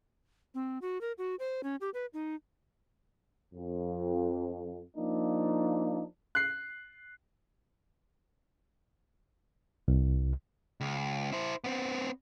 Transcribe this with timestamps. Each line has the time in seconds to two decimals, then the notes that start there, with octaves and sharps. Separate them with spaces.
0.54 C4
0.82 F#4
1.01 A#4
1.18 F#4
1.39 C5
1.63 C#4
1.81 G4
1.94 B4
2.14 D#4
3.54 F2
4.96 F3 A#3 D4 D#4
6.35 F#6 C7
9.88 C2
10.81 C#2
11.32 E4 C5
11.64 B3 C4